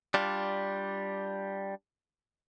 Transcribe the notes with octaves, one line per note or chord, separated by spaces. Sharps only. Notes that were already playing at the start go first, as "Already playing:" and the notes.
G3 D4 F4